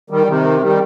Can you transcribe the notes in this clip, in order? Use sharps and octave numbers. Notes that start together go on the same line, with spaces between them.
D#3 G3
C3 D#3
D#3 G3